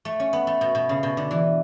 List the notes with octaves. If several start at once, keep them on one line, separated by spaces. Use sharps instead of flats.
A3
C#4
B3
A3
B2
B2
C#3
B2
D3
E3